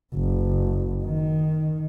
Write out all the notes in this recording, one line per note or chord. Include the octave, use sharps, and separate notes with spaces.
F#1
D#3